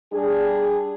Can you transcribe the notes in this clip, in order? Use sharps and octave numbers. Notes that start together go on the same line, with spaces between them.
G3 D4 G#4